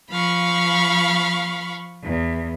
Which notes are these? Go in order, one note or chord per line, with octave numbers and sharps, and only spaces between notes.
F3 F5 B5 C#6
E2